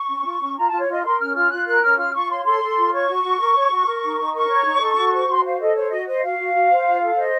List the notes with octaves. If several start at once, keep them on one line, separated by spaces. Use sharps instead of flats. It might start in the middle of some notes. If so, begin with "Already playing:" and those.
Already playing: C#6
C#4
F4
C#4
F4 A#5
F4 A5
C#5
F4 D#5
A#4 C6
C#4 F6
F4 F6
F4 F#6
A#4 F#6
C#4 F6
F4 F6
F4 C#6
C#5 C6
A4 C6
A4
F4
C#5 C#6
F#4
F#4
A#4
C#5
F#4
A#4
D#4
D#4
A#4 C#6
C#5
D#4
A4
F#4
C5
F#4 C6
F#5
C5 F5
A4 D#5
C5 C#5
F#4 D#5
C5 D#5
F#4 F5
F#4
F#4
C5
F4
A4
C5 D#5